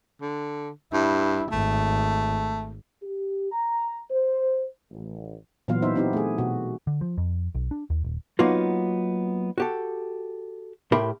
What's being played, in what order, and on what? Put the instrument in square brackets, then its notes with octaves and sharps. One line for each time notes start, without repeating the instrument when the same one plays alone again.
[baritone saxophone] D3
[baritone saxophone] G2 [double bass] E4
[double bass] G#1 [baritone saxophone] A3
[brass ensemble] G4
A#5
C5
A1
[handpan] A#2 E3 F#3 B3 F4 F5
B3 D#4 C5 E5
B3 C4 D#4 E4 G4
A3 G#4
B2 F#4
[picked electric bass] D3
F3
F2
B1
D4
D#2
D#1
[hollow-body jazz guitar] F#3 A#3 B3 D#4 F4 F#4
F#4 G4 A4
A2 G4 A#4 E5 B5 C6